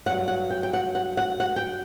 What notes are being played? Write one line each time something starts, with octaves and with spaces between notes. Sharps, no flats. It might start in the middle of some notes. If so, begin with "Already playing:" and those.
G2 F#3 F#5
F#5
G5
G5
F#5
F#5
F#5
F#5
G5